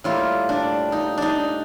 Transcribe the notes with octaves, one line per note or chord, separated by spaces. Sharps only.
A2 G3 A#3 F4
D4
D#4
D4 D#4